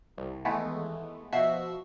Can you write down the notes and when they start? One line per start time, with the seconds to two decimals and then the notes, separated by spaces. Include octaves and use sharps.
0.18 C2
0.45 D#2 E3 G#3 A3 B3
1.32 B2 F3 F#4 E5 C7